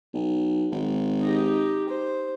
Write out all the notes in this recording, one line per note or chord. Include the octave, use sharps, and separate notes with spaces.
B1
G#1
D#4 G4
C5